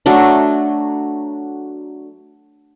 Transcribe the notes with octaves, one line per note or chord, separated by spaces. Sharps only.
F#3 A3 D4